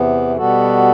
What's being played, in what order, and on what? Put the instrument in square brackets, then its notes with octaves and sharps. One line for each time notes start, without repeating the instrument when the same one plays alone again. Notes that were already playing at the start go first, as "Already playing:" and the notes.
Already playing: [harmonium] E2 C3 E3 B3
B2 G3 B3 F#4 A4